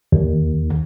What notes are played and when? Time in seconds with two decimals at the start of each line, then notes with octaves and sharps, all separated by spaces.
0.12 D#2